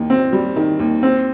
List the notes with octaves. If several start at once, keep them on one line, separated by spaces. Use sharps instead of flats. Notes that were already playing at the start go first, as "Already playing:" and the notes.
Already playing: D#2 D#3
C4
G3
D#3
D#2
C4